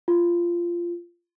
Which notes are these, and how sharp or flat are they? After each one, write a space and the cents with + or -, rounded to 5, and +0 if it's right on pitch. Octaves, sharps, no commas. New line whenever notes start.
F4 -15